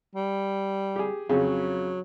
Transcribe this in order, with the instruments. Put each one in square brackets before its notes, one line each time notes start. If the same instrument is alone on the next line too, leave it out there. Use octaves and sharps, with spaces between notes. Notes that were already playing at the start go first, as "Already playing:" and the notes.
[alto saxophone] G3
[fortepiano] G4 G#4
[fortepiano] F2 C#3 [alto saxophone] F#3